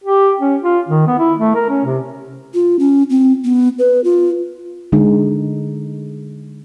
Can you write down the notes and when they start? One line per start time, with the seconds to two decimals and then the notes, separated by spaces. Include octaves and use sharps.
0.04 G4
0.40 C#4
0.62 F4
0.89 D#3
1.07 B3
1.19 E4
1.39 A3
1.55 A#4
1.69 C#4
1.85 C3
2.54 F4
2.79 C#4
3.10 C4
3.44 B3
3.79 B4
4.04 F4
4.92 D3 G#3 D#4